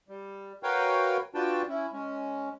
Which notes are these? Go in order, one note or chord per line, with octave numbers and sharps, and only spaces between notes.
G3
F#4 A#4 B4 C#5 F5 G5
D4 F4 F#4 B4 G5 A5
C#4 E4
G#3 C#4